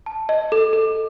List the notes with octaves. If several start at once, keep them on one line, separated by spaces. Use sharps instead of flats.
A5
D#5
A4
A4